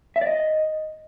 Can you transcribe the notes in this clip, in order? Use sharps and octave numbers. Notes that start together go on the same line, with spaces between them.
E5
D5
D#5